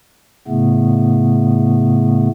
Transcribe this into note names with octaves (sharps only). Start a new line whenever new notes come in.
A2 C#3 A3 B3